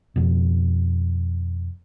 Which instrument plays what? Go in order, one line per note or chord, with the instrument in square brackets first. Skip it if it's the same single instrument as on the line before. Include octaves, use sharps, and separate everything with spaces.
[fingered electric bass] F2 B2